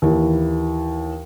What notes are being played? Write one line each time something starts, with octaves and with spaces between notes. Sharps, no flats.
D#2 E3